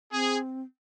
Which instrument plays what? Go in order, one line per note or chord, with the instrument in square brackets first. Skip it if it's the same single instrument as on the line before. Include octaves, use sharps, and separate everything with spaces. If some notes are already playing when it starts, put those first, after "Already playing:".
[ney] C4 [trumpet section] G#4